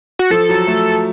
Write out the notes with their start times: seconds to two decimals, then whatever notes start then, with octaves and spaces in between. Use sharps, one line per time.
0.19 F#4
0.30 F3 A4
0.49 F#3
0.67 A3